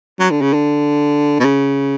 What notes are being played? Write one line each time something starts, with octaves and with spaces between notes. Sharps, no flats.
F#3
D3
C#3
D3
B2
C#3